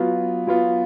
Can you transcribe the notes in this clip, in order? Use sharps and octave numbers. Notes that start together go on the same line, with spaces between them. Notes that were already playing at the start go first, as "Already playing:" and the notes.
Already playing: F#3 B3 F4
F#3 B3 F4